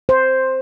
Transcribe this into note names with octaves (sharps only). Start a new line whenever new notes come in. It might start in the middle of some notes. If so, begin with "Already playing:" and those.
C5